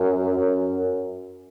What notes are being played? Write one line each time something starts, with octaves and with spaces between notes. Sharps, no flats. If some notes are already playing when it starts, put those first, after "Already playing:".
Already playing: F#2
F#2